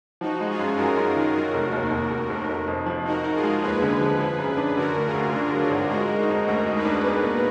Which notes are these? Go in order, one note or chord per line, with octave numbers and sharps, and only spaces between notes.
F3 D#4 F#4
G#3
F4 G#4
F#2
F#2 F#4 A#4
F#2
D#3
F#3 F#4 A#4
F1
D#2
F1
F1
F1
F1
F2
F3
D#4 F#4 A#4
D#4
F4 G#4
G#3
D#2 G#4 B4
D3
F3
F3
F#2
D4
D3 F#4 A#4
D2
F4 G#4
D2
D3 D4 F4
F#3
D4 F4
G#1
G#3 F#4 A#4
G#3
D#4 F#4
F2
D2 F#4 A#4
G#3
G#4 B4
D4
B3
A#2